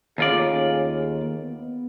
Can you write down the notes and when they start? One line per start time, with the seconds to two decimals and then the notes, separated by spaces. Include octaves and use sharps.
0.18 D#2 A3 C#4 F4 G#4 D5
1.39 B3